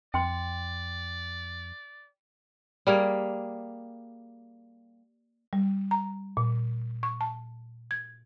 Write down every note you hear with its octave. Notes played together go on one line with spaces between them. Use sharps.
F2 D5 G5 C6
G3 A#3 G#4
G3
A#5
A#2
C#6
A5
G#6